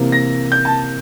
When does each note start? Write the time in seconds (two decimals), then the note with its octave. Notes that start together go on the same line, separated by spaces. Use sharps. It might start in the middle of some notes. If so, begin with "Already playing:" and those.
Already playing: C3 E3 A#3
0.12 A#6
0.52 G6
0.65 A5